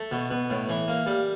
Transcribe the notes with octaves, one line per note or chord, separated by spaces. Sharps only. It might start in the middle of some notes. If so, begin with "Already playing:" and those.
Already playing: A3 A4
B2
B2
A2
E3
A#3
G3